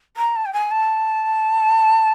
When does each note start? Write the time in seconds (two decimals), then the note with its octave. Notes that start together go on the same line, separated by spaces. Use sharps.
0.17 A#5
0.36 A5
0.46 G5
0.53 G#5
0.71 A5